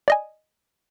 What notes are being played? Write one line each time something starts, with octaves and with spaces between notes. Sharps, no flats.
D5 D#5 G#5